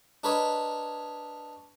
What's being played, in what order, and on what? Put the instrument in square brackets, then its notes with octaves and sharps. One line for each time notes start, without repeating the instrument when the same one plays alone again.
[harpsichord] D4 A#4 B4 C#5 D#5